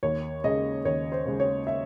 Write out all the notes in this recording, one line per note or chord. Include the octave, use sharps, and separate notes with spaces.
D#2 C#5
C#3 G#3 D#5
D#2 C#5
C5
C#3 G#3
C#5
E5